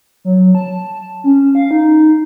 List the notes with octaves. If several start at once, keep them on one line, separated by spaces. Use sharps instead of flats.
F#3
A5
C#4
F5
D#4